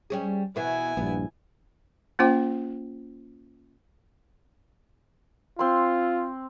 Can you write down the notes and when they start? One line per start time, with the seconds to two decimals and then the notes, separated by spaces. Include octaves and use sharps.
0.10 G3 C#4 G#4
0.56 B2 E3 B3 E4 G#5
0.97 A#1 G2 B3
2.19 A#3 C#4 F4 C5 G5 D6
5.59 C4 F4 C6